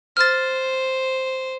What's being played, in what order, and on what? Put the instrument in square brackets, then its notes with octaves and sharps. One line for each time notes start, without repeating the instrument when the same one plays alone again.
[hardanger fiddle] C5 [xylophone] F6 A6